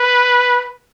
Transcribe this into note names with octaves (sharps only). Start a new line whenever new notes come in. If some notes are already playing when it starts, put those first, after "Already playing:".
Already playing: B4